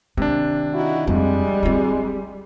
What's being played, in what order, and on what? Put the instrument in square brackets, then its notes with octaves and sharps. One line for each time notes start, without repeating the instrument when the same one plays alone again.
[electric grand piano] C3 D4 [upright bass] D#3
[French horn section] D#4 E4 F#4
[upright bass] F2 E4 [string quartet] G3 [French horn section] G#3
[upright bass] C4 F4